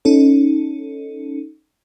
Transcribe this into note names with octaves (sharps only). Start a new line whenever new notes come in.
C#4 D#4 A4